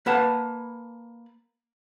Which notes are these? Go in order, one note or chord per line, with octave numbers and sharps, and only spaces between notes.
A#3 B4 F#5 A5